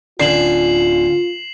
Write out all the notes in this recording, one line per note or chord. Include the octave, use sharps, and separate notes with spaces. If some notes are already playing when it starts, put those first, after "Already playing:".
D1 D3 C#4 F4 C7 E7 F#7